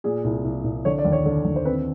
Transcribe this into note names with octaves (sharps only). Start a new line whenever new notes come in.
A#2 G#4
C2
C2
C2
D3 C#5
D5
D#2
C#5
D3
D#2
C5
C4 B4